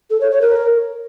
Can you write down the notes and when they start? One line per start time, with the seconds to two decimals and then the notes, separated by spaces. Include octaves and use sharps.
0.10 A4
0.21 C#5
0.31 C#5
0.41 A#4